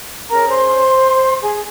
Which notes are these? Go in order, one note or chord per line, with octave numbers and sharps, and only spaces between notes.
C#4 G#4 A#4 C#5 A#5
C5 C6
G#4 G#5